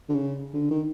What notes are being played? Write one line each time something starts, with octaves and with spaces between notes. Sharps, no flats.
D3
C#3
D3
D#3